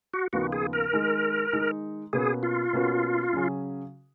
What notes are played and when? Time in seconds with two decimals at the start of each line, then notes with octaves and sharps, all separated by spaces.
0.14 F#4
0.33 D#2 C#3 F3 B3 D#4 F#4
0.52 G#4
0.73 A#4
0.93 D#3 G#3 D#4
1.53 D#3 G#3 D#4
2.13 B2 A#3 C#4 F#4 G#4 B4
2.43 F4
2.73 B2 A#3 C#4 F#4 B4
3.33 C#3 F#3 C#4 G#4